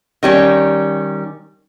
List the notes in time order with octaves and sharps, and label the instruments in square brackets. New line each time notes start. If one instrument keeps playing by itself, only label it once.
[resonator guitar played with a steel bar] D#3 G3 C#4